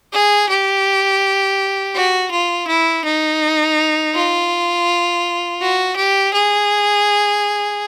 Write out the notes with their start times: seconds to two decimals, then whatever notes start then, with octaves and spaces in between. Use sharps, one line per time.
0.13 G#4
0.49 G4
1.95 F#4
2.31 F4
2.68 E4
3.05 D#4
4.15 F4
5.61 F#4
5.96 G4
6.34 G#4